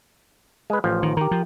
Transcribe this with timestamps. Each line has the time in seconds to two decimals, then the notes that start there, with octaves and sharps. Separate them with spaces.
0.70 G#3 B4
0.84 A1 F3
1.03 D#3
1.17 D#3 G4 A#4
1.31 F3